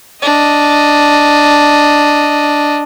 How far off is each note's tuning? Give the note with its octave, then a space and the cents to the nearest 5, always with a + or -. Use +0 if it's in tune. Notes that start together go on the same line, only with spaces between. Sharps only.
D4 +0 D#5 +0